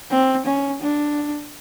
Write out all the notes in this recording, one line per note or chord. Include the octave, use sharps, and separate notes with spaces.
C4
C#4
D4